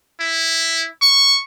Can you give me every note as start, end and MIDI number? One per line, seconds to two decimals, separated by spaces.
0.20 0.87 64
1.02 1.41 85